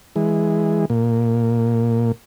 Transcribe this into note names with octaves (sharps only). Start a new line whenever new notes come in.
E3 G#3
A#2